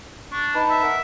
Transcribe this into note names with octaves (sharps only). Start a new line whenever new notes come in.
D4 C#6
D#4 B4 A5
E5
A#4 F#5